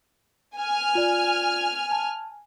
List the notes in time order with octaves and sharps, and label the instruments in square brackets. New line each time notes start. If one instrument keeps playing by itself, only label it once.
[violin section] G#5 F6
[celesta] F4 D5
A5